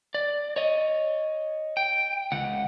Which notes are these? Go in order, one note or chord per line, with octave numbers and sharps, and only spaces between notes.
D5
C#5 D#5
G5
C#2 F#5